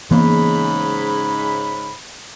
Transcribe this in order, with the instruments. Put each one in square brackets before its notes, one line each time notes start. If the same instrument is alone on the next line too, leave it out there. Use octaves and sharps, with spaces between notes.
[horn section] G#2 C#3 B5 [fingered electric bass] E3 A#3 B3